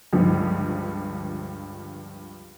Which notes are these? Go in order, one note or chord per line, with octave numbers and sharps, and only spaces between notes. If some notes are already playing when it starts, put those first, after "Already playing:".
C#2 G2 D3 F3